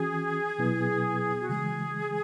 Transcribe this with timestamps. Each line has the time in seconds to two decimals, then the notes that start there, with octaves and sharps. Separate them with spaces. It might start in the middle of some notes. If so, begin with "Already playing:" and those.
Already playing: E3 C#4 F#4 G#4
0.59 B2 F#3 B3 E4 B4
1.40 F#4
1.49 C#3 E3 G#3 G#4